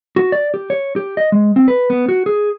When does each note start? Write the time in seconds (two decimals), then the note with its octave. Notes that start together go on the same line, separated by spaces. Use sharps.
0.16 F#4
0.32 D5
0.54 G4
0.70 C#5
0.96 G4
1.17 D#5
1.32 G#3
1.56 C4
1.68 B4
1.90 B3
2.09 F#4
2.26 G#4